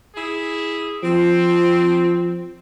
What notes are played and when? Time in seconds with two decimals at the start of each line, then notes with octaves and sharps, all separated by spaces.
0.16 E4 G#4
1.03 F3 C4